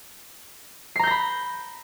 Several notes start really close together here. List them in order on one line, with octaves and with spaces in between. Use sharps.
C7 A#5 G6 A#6 B5